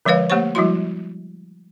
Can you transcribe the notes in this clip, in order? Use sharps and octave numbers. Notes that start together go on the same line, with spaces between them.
D3 F3 G#3 B4 C#5 F5
A3 A#3 G4 C5 C#5 C#6
F3 G3 G#3 E4 F#4 C6